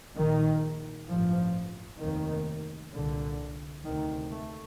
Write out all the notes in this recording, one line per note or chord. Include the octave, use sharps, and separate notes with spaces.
A#1 A#2 D#3
A1 G2 F3
F1 D#2 D#3
C2 A#2 D3
D2 C3 D#3
A3